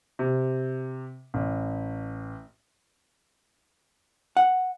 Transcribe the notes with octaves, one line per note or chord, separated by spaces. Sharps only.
C3
A1
F#5